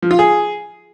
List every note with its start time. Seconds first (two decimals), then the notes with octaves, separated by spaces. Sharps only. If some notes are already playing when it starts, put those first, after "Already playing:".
0.02 F3
0.11 F4
0.19 G#4